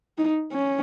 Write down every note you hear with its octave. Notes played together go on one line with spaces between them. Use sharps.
D#4
C#4